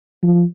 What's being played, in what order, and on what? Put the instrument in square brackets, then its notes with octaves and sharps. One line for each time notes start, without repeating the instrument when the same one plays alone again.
[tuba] F3